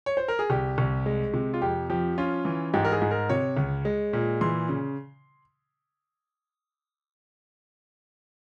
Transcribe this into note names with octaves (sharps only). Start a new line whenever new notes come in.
C#5
C5
A#4
G#4
C2 G4
C2
G#3
C3
F4
F2 G4
F3 G4
C#4 F4
E3
G#2 G4
A#4
G#4
G#2
A#4
C3 C#5
C#2
G#3
A#2
E3 C6
C#3